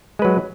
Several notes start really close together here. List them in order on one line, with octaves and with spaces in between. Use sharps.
G#3 B4 F#3